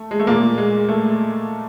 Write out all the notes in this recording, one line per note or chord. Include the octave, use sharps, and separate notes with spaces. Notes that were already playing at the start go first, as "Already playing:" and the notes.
Already playing: A3
G#3
A3
A#2 A#3
G#3
A3